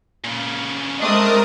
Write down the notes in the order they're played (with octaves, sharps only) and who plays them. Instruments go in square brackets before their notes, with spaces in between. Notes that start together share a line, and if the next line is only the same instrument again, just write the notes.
[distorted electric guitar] A#2 C#3
[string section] G#3 D#5 D#6 [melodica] A3 C4 D5 [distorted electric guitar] D4 [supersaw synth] A#4